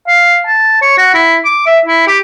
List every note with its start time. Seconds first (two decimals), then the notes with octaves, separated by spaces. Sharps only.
0.07 F5
0.47 A5
0.82 C#5
0.98 F#4
1.14 E4
1.45 D6
1.67 E5
1.86 E4
2.07 G4